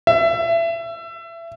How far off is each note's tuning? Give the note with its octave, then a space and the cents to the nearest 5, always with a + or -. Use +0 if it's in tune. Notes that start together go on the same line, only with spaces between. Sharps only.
E5 +25